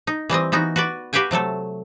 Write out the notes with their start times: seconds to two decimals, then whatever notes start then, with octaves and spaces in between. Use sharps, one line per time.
0.07 D#4
0.29 E3 G3 C4 D#5
0.52 E3 B3 D#4 F#4
0.76 F#4 B4 D5
1.13 F#4 G4 B4 F5 G5 G#5
1.31 C3 F#3 A3 A4